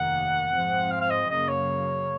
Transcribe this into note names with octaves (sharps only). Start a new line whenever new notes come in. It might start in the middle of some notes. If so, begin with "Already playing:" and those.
Already playing: F1 D#2 D#3 A#3 F#5
G#2 F3 C4
F5
F5
D#5
F#2 C#3 F#3 A#3 D#5
C#5